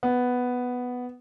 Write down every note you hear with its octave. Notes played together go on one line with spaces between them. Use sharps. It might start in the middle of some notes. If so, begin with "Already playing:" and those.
B3